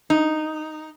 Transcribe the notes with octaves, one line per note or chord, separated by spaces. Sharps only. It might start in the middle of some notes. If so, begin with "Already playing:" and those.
D#4